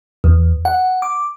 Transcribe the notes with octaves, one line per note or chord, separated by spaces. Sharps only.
E2
F#5
D6